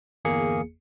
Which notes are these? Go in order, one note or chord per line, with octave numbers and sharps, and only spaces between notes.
G1 E2 A#3 G#4 C#7